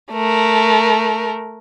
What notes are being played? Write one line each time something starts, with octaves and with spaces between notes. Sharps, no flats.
A3 A#4